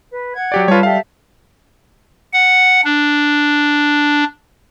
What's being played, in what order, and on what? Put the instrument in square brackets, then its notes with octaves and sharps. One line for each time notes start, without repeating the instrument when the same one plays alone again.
[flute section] B4
F#5 G#6
[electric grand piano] F#3 G4 D5
[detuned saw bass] G3 [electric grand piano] F4 C#5 [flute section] A4 B4 A5
[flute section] A4 E5 G5 [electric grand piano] F5
[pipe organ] F#5
D4